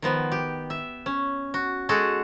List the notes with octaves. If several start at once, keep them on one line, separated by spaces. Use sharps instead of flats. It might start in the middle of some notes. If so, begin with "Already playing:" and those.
D#3 F3 B3
G4
E5
C#4
F#4
G#3 F#4 G#4 A4